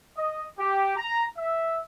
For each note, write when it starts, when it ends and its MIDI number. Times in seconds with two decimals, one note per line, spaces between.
0.17 0.44 75
0.59 0.93 67
0.96 1.24 82
1.36 1.79 76